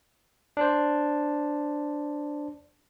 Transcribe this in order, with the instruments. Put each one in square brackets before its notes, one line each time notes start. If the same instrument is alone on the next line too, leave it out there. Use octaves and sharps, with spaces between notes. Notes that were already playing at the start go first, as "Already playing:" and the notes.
[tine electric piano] D4 C5